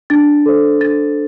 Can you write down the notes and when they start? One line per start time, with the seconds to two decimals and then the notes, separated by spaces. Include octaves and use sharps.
0.10 D4 A6
0.46 A4 C5
0.81 D4 A6